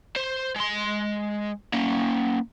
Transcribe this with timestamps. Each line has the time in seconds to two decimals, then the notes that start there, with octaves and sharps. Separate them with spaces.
0.16 C5
0.56 G#3 C6
1.74 A#3 C#4